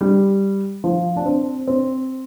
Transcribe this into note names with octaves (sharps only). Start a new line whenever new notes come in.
G3
F3
D4
C4
C4